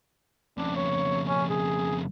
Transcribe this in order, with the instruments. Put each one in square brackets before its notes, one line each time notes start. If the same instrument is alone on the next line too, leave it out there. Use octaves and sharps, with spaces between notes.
[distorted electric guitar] F2 C#3 [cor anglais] D4
[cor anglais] C#5
C#4
G#4